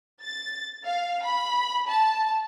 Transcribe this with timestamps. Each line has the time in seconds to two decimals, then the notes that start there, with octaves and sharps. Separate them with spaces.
0.23 A6
0.85 F5
1.24 B5
1.88 A5